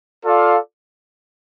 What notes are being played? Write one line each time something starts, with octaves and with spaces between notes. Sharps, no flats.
F4 A4 D5 F5